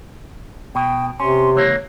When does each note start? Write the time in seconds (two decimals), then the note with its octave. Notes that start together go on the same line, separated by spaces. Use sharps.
0.75 B2 G5
1.20 C3 C#4 C6
1.56 C#2 E3 A#3 C#5